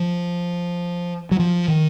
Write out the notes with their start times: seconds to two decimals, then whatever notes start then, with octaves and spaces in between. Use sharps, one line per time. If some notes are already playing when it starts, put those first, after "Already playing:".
Already playing: F3
1.31 F#3
1.39 F3
1.68 D#3